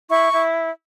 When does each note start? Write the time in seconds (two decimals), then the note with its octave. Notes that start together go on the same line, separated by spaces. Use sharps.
0.09 E4 C#6
0.33 E4